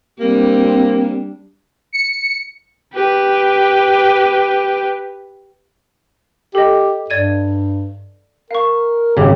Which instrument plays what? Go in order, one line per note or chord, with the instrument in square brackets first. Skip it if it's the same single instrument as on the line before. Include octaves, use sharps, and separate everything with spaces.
[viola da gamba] G3 D4 [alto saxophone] A#3 [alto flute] C4
[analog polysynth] C#7
[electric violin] G4 B4
[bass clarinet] G4 [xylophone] A4 D#5
[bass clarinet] G2 [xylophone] D5 G#6 D#7
[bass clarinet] A#4 [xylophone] F5 C#6
[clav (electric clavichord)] G#1 F#2 C#3 [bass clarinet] G4 [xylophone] C#5